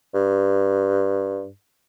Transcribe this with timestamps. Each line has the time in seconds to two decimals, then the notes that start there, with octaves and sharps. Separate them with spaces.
0.14 G2